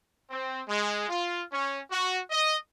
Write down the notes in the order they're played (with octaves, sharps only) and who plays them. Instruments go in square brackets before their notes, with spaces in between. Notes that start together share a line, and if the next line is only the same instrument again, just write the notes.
[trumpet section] C4
G#3
F4
C#4
F#4
D#5